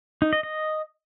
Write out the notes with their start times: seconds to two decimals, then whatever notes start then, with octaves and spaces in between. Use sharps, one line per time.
0.22 D#4
0.33 D#5
0.43 D#5